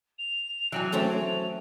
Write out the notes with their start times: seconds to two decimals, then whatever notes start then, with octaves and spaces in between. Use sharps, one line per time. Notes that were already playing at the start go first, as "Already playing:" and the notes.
0.19 F7
0.72 E3 F#3 G5 G#5 F#6
0.92 A3 C4 C#4 F7